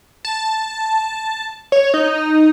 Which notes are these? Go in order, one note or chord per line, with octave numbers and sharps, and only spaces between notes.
A5
C#5
D#4